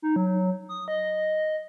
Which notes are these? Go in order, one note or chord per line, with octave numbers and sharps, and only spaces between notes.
D#4
F#3
D#6
D#5